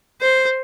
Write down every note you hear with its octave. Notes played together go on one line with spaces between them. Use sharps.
C5